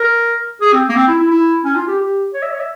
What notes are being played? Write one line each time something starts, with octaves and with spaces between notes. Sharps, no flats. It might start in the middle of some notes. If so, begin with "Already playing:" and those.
Already playing: A#4
G#4
C4
A#3
C4
E4
E4
E4
C#4
F4
G4
G4
C#5
E5
C#5
E5